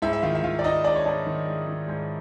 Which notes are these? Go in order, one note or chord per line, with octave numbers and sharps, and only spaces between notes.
G#2 E4 E5
E5
D#3 F4 F5
E5
D#3 F4 F5
D5
G#2 D#4 D#5
G#2 D4 D5
C#5
G#2 D4 D5
D#3
G#2
D#3
G#2